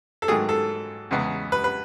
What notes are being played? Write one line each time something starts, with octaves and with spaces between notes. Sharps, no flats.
A4
G#2 D#3 F#3 A3 G#4
A4
E2 C#3 G#3 B3
B4
B4